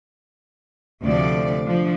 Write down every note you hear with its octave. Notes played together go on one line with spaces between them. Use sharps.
D2 C3 F3 A3 D5
F3 D4